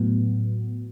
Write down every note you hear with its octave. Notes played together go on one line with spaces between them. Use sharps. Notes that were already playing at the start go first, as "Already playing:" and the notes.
Already playing: A2 F#3 B3